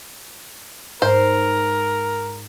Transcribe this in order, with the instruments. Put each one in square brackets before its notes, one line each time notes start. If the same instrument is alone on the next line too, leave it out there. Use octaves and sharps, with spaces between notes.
[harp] G#2 [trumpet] A#4 [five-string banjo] C5